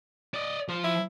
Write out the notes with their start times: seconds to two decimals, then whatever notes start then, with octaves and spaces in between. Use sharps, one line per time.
0.34 D5 D#5
0.69 F3 C5
0.84 E4